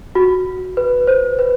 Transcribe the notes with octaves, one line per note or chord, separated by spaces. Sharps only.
F#4
B4
C5
B4